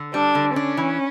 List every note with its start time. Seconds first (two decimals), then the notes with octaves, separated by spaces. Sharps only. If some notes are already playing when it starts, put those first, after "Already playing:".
Already playing: D3
0.14 G3 D4
0.35 D3
0.56 C#4 D4
0.77 E3